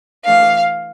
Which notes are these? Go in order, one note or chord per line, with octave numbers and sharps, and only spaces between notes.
E3 A3 D4 F5